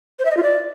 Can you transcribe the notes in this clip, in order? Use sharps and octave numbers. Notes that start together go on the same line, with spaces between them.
C5
E5
D#5
F4
D5